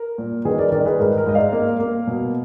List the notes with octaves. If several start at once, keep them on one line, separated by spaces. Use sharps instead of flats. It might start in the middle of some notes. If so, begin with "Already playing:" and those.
Already playing: A#4
A#2
D#3 G#4 B4
A#4 D5
D#3 A#4 D5
G#4 B4
G#2 A#4
A#4
G#2 D#5
D5 F5
A#3
A#3
B2